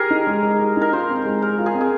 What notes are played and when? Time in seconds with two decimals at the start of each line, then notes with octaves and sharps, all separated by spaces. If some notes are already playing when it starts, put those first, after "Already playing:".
Already playing: G4 G#4 A#4
0.11 D#4
0.27 G#3
0.43 G#3
0.59 G4
0.77 D#4 A#4
0.93 F4 C5
1.09 C4
1.25 G#3
1.42 G#3 A#4
1.59 F4
1.66 G#4
1.75 C4
1.81 G#4